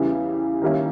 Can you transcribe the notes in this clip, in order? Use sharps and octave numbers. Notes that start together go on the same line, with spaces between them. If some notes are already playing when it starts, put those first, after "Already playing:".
Already playing: E2 C#3 E3 G3
D#3 G3 A#3 C#4 E4